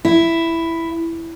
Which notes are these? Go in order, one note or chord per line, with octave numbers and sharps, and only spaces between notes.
E4